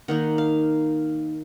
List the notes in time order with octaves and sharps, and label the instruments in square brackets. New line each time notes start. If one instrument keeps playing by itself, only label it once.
[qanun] D#3 A#3 D#4 F#5
F5